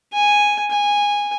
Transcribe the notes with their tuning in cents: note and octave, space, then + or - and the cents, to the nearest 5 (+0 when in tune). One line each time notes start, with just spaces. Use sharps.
G#5 -5
G#5 -15